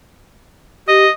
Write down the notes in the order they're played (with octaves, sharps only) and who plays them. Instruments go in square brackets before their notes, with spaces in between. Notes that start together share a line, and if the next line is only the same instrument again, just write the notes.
[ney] G4 [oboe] D#5